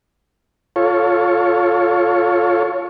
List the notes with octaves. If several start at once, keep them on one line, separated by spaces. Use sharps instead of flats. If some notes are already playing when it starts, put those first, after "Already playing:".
F4 A4 C#5